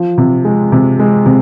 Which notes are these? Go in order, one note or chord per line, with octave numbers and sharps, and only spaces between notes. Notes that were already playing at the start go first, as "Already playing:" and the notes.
Already playing: F3
C3
G#3
C3
G#3
C3